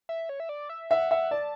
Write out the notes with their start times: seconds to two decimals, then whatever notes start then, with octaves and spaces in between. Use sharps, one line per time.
0.09 E5
0.29 C#5
0.40 E5
0.49 D5
0.69 E5
0.90 E5 F#5
1.11 E5
1.31 D5 A5